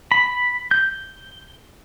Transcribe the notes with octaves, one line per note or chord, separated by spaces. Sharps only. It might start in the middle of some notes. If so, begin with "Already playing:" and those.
B5
G6